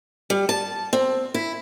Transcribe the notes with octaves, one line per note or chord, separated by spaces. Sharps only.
G3
A5
C4
E4